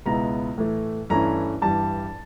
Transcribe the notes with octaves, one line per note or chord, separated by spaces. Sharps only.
C#2 B2 G#3 B3 E4 A#5
A2 E3 A3
G2 E3 A3 C#4 E4 A#5
G2 E3 G3 A5